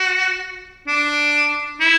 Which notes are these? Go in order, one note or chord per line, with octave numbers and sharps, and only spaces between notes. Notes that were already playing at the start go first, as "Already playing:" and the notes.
Already playing: F#4
D4
E4